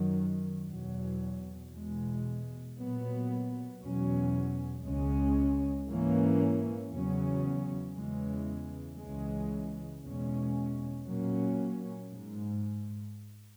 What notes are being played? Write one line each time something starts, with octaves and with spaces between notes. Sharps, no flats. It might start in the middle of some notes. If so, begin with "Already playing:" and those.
Already playing: F#2 D#3 F#3
E2 B2 F#3
E2 B2 G#3
A#2 F#3 B3
E2 B2 F#3 C#4
C#2 C#3 G#3 C#4
G#2 E3 A#3 C#4
E2 C#3 F#3 C#4
E2 C#3 E3 G#3
C#2 C#3 E3 G#3
E2 B2 G#3 C#4
A#2 F#3 A#3 C#4
G#2